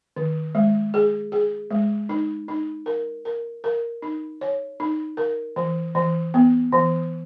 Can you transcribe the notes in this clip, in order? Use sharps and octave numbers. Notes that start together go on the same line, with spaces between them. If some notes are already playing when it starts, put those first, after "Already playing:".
D#3
G#3
G#4
G#4
G#3
D#4
D#4
A#4
A#4
A#4
D#4
C#5
D#4
A#4
E3
E3
B3
E3